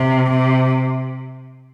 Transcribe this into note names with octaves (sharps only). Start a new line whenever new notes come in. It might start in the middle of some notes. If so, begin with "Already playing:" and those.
Already playing: C3
C3